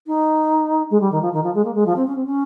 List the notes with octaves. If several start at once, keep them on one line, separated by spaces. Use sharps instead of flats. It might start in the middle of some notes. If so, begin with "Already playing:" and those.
D#4
G#3
G3
D#3
F3
D#3
F3
G#3
A#3
G#3
F3
C4
C#4
C4
C#4